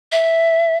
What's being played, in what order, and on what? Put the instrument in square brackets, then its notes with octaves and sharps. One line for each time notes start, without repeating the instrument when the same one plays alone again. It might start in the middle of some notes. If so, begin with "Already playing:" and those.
[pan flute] E5